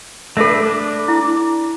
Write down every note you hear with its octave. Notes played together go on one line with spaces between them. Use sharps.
A3 D4 A4 B4 E5
D4
E4